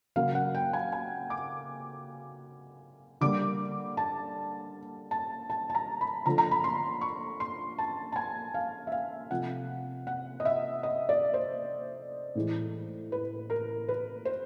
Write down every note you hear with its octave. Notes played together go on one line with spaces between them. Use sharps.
C#3 F#3 A#3 F5
F#5
G5
G#5
G#5
D6
D3 G3 A#3 D6
A5
A5
A5
A5
A#5
B5
D3 F3 A3 A#5
A#5
B5
C6
C#6
C6
A5
A5
G#5
F5
E5
F5
C3 F3 A3 F#5
F#5
D#5
E5
D#5
D5
C5
A2 E3 G#3
B4
A#4
B4
C5